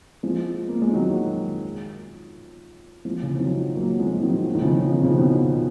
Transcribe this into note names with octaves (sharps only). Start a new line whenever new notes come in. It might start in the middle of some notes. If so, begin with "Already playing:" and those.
F3 G#3
A#3
G#3
D#3 F#3
F3 G#3
C#3 F3
F3
D#3 F#3
F#3 A#3
F3 G#3
F3
D#3 F#3
F3
D#3
C#3 F3
F3
D#3
C#3 F3
B2 D#3